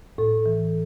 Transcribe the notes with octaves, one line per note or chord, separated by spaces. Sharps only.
A2 A4
E3